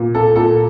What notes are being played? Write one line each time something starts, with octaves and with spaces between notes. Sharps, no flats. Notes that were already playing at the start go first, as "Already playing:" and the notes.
Already playing: A#2
A4
A#2 A4